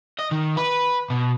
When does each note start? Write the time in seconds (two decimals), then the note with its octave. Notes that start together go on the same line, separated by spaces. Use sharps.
0.19 D#5
0.32 D#3
0.57 B4
1.10 B2